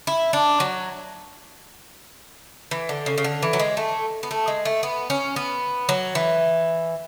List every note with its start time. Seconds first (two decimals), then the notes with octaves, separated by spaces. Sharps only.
0.07 E4
0.33 D4
0.60 F#3
2.71 E3
2.89 D3
3.06 C#3
3.18 C#3
3.24 D3
3.43 E3
3.53 F#3
3.60 G#3
3.77 A3
4.23 B3
4.31 A3
4.48 G#3
4.65 A3
4.83 B3
5.10 C#4
5.36 B3
5.89 F#3
6.15 E3